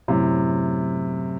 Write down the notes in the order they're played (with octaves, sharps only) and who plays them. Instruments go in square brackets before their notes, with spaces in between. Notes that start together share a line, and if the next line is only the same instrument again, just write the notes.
[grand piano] F#2 A2 C3